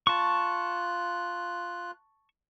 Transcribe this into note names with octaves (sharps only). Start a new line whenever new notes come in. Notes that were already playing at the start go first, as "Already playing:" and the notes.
F4 A5 C#6 F#6